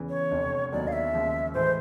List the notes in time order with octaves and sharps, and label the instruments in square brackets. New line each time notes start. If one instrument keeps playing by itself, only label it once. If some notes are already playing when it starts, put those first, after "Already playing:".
Already playing: [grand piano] E2 C#3 E3
[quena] C#5
[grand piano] F1 F2 D3
[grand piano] D#2 D3 F#3 B3 D#4 [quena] D5
[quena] F5
E5
[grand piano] D#2 C#3 F3 G#3
[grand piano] A2 E3 G#3 [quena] C5